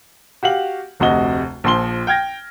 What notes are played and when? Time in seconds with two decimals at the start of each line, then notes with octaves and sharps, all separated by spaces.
0.43 F#4 G4 F5 F#7
1.00 F1 D2 C3 F#4 D#5 G7
1.64 A#1 F3 C6 G7
2.07 G5 F6 G#6 A#6